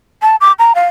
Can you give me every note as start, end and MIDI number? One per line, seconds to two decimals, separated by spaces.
0.22 0.36 81
0.41 0.52 86
0.59 0.73 82
0.75 0.86 77